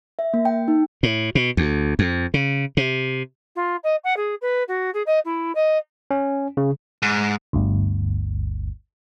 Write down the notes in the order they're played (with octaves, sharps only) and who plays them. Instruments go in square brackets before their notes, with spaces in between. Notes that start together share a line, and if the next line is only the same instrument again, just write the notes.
[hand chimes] E5
A#3
G5
D#4
[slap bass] A2
B2
D2
F2
C#3
C3
[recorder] F4
D#5
F#5
G#4
B4
F#4
G#4
D#5
E4
D#5
[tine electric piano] C#4
C#3
[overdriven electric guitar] G#2
[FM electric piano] G1 D2